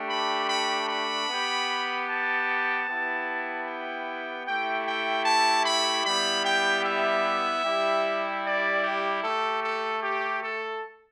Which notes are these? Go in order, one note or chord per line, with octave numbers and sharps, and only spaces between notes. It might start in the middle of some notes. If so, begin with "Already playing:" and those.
Already playing: A3 D4 G4
B5
B5
B5
B3 G4
A5
B3 E4 G4
G5
A3 E4 G4 G5
G5
A5
B5
G3 B3 E4 G4 B5
G5
E5
G3 E4 G4
D5
G4
A3 G4 A4
A4
G4
A4